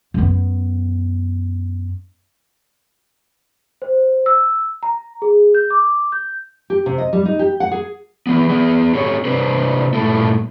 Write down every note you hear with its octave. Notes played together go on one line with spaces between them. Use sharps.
F#2 B3
C5
E6
A#5
G#4
G6
D6
G6
G4
C3
D#5
G3
D#4
G4
F#5
G#4
E3 B3
B3 G#4
C4 G4 A4 C#5
C3 A#3 D4 B4 C5
G2 A#2 A3 E4 A4